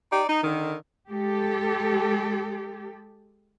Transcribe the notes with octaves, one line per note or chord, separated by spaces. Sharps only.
D#4 G4 D5
D#4
D3 D#3
G#3 G4 A4